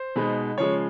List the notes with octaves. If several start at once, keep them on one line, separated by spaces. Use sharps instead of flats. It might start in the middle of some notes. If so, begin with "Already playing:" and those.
Already playing: C5
B2 G#3 B3 D#4
C#3 F3 G#3 C#5